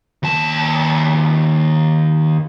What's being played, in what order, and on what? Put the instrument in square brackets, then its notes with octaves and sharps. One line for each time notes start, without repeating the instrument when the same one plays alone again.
[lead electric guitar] D#2 A5